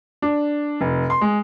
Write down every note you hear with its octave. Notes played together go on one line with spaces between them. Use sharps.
D4
F1
C6
G#3